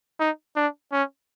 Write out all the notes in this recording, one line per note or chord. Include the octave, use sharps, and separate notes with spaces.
D#4
D4
C#4